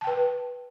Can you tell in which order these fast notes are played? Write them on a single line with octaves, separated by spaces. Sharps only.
A5 G5 B4